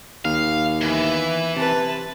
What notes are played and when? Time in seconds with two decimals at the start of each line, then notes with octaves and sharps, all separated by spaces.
0.25 D#2 F5
0.81 E3 B3 E5
1.56 C3 B4 A5